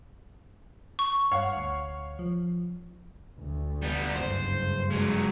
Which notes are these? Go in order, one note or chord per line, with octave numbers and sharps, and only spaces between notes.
C#6
G2 C#5 F5 F#5
D2
F3
D2
G3 B3
F#1 G2 C5
F#3 G#3